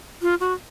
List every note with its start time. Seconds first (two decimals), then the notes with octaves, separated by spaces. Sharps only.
0.22 F4
0.40 F#4